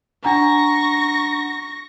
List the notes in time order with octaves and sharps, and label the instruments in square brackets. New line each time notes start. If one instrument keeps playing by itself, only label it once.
[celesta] D4 F#5 A#5 [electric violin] C#6 A#6